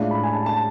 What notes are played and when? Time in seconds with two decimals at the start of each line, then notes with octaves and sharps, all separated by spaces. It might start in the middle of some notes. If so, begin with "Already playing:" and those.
Already playing: A2 G#3 D4 F4
0.11 B5
0.24 G#5
0.33 A5
0.46 A5